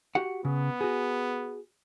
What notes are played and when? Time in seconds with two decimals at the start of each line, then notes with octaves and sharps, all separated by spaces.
0.15 F#4 G4 F#5
0.45 C#3 B3
0.81 F#4 G#4